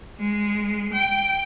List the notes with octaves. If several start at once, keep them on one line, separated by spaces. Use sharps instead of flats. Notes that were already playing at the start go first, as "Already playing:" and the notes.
G#3
G5